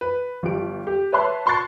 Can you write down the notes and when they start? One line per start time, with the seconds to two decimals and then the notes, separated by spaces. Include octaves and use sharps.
0.01 B4
0.43 G1 F3 G4 D7
0.87 G4
1.12 B4 C#5 E5 A5 C6 F#6
1.46 A5 C6 C#6 F#6 A6 C7